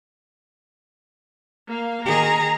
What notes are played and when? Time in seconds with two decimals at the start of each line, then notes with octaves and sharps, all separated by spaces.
1.68 A#3 F5
2.05 D#3 G#4 A#5